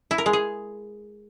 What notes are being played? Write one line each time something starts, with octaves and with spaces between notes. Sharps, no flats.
E4
A#4
G#3
G#4